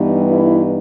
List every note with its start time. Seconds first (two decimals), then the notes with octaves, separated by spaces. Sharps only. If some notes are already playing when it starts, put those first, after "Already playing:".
Already playing: G2 E3 G3 B3 D#4
0.30 E4